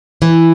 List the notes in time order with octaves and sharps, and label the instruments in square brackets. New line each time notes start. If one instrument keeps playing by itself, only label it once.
[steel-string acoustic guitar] E3